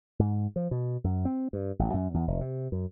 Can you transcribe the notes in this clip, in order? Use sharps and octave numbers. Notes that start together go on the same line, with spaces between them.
G#2
F3
B2
F#2
C4
G2
A1
F#2
E2
F1
C3
F#2